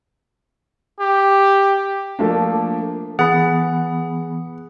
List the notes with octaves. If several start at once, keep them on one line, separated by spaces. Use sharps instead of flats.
G4
F3 A3 A#3 D4
E3 B3 G#4 F#5 B5